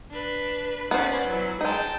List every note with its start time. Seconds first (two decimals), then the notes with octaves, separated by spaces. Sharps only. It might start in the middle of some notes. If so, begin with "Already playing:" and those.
0.11 D4 B4
0.91 B3 C#4 C5 D5
1.27 E3 F#3
1.61 G#3 D#4 G5 A5